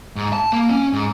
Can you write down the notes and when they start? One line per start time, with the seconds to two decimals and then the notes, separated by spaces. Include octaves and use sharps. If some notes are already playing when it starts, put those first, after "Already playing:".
0.16 G#2
0.33 A5
0.53 A#3
0.70 C#4
0.93 G#2